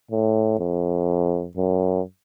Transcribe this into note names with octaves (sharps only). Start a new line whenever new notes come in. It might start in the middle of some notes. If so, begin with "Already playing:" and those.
A2
F2
F#2